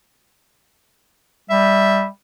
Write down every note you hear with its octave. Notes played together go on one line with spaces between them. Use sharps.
G3 E5